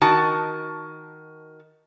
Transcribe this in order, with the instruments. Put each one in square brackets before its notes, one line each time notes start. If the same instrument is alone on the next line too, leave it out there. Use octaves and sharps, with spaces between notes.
[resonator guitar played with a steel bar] D#3 F#4 A5